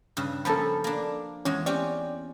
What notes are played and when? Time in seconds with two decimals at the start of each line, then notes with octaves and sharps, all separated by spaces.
0.17 G2 C#3
0.45 F3 A#3 C#4 A4 A5 B5
0.84 A#3 D4
1.45 E2 G#3 C#4
1.66 C4 C#4 G4 D5